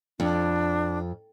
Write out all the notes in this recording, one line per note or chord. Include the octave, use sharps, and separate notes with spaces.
F2 D4